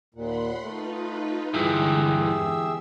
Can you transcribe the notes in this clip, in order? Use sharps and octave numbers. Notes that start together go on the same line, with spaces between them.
D#2 A#2 F#5 B5 C6
A3 D#4 F4 B4
G2 D3 E3 G#3 G4 G#4 E5
E2 E6